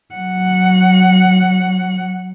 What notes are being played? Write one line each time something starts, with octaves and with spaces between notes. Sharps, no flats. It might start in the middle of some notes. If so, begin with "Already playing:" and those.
F#3 F#5